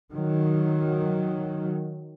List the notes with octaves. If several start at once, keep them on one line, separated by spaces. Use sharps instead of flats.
D#3 F#3